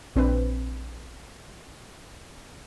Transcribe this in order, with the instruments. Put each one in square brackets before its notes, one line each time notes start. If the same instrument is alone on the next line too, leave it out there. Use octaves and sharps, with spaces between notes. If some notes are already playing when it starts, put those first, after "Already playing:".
[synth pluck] A#1 C4 D4 B4